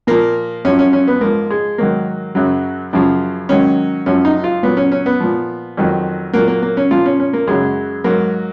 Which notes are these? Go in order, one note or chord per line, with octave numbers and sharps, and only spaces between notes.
A#2 F3 A#3
F#2 F3 C#4
C#4
C#4
B3
G#2 F3 A#3
G#3
G#2 D#3 F#3 A#3
F#2 C#3 F#3
F#2 C#3 F3
G#2 D#3 F#3 C#4
F#2 F3 C#4
D#4
F4
A#2 F#3 B3
C#4
C#4
B3
A#2 F3
F2 D#3 F#3
A#2 F#3 A#3
A#3
A#3
C#4
A#2 F3 F4
C#4
C#4
A#3
F#2 C#3 F#3 G#3
G#2 F#3 A#3